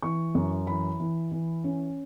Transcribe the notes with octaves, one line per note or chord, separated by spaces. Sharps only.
E3 C#6
F#2
E3 B5
E3
E3
C#4